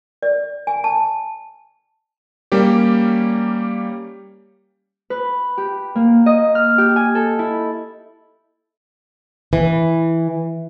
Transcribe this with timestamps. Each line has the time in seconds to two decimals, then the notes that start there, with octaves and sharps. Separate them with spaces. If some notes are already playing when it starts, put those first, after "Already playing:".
0.23 D5
0.67 G#5
0.84 A5
2.52 G3 A#3 C#4 G4
5.10 B4
5.58 G4
5.95 A#3
6.26 D#5
6.55 F6
6.78 G4
6.96 G#5
7.15 A4
7.39 E4
9.53 E3